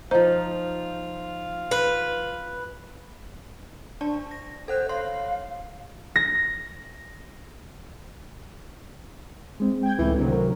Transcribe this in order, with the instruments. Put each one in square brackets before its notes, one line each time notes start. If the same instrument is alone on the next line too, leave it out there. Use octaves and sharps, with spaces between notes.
[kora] F3 D#4 [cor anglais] F4 [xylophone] C5
[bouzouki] B4
[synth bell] D4 D5 A5
A#6
[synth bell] A4 F#5 F#6 [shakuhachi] C5
[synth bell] C#5 C6 [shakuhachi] F5
[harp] A#6
[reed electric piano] G#3 C4
[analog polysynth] G5 G#6
[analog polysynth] C#2 A2 [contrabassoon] E3
[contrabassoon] D1 [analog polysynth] C3 F#3
[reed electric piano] D#3 A#4